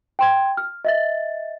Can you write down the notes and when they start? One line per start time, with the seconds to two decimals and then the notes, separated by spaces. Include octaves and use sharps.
0.19 G5 C6 G#6
0.57 F6
0.85 D#5 E5 A6